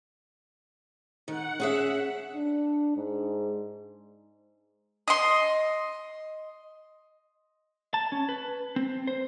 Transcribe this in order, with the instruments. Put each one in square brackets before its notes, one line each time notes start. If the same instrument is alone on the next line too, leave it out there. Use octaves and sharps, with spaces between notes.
[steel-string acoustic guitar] D#3 [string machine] F#5
[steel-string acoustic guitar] C#4 G#4 E5
[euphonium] D4
G#2
[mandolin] D#5 C6
[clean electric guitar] A5
C#4
B4
C4
C5